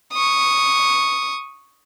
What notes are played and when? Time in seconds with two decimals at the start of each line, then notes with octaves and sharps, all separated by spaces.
0.13 C#6 D#6